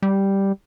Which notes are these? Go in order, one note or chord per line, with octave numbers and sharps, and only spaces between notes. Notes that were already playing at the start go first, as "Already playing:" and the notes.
G3